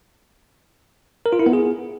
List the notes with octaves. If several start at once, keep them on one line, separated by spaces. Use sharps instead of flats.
A#4
F4
E4
B3
G#4